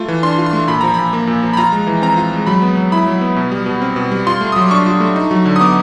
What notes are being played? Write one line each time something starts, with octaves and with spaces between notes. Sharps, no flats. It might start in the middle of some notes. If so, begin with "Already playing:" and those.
Already playing: A3 F4
E3
D4 C6
F4
C6
A3
A#2 B5
F3 A#5
A#2 B5
A#3
A#2
F3
B5
F4 A#5
G#3
E3
C4 A#5
F4
G#3
F#3 B5
B3
F#3
E4 B5
F#3
B3
B2
G3
B2
C4
B2
G3
F4 C6
A3
F#3 D#6
D6
D4 C#6
F4
A3
D#4
F#3
D3
D#6
B3 D6